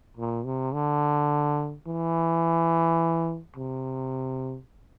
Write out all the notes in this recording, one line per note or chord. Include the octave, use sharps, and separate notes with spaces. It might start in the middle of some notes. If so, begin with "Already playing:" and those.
A#2
C3
D3
E3
C3